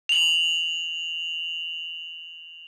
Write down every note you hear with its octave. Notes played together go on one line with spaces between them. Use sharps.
F7 F#7